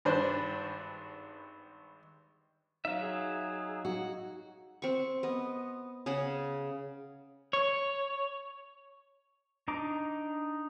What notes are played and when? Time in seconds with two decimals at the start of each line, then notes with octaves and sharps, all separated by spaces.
0.05 G#1 G2 D4 B4 C5
2.85 F#3 D#4 E5 F5
3.02 G#4
3.85 F#4
4.82 C4 C#6
5.23 B3 D#5
6.06 C#3 G#4 F#5
7.53 C#5
9.68 D4 D#4 A#5 D6